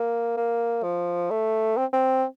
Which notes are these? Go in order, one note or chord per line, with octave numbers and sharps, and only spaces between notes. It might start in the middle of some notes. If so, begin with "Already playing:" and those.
Already playing: A#3
A#3
F3
A3
C4
C4